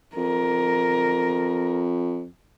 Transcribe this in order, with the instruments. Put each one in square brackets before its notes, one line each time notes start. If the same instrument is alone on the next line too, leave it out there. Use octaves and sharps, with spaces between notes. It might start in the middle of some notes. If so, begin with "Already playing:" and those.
[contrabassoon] F2 [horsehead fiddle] A#4